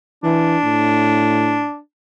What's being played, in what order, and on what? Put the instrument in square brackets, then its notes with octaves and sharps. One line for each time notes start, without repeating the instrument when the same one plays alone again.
[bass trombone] E3 [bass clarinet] D4
[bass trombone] A2